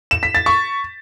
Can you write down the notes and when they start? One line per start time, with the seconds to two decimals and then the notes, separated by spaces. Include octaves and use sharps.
0.11 E7
0.23 B6
0.35 A6
0.46 C#6